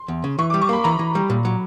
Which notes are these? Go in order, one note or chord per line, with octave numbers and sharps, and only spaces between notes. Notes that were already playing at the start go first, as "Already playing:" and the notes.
Already playing: C6
E2
C#3
E3 C#6
D6
G3
C#6
A#3 B5
E3 A#5
E3
G3
A#2
F#3